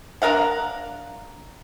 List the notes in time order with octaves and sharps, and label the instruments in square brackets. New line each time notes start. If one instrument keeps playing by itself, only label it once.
[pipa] D4 A#4 F5 F#5